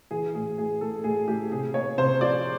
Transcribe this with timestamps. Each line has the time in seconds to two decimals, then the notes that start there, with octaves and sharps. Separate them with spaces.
0.11 E3 G#4
0.35 A2 G#4
0.58 A2 G#4
0.81 A2 A4
1.04 A2 G#4
1.28 A2 G4
1.52 C3 G#4
1.74 A#3 C#5
1.98 C3 C5
2.21 F3 D5